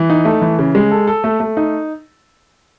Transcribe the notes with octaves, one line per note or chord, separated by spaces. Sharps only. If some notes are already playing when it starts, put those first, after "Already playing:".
Already playing: E3
D#4
A3
E3
C#3
G#3
A4
A4
A3
A3
D#4